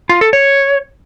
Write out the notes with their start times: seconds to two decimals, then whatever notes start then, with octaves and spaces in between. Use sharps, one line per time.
0.09 F4
0.21 A4
0.33 C#5